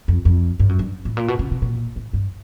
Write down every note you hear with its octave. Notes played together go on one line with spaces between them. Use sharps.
F2
F2
G2
F#2
G2
A2
A#2
B2
C#3
C3
A#2
A2
G2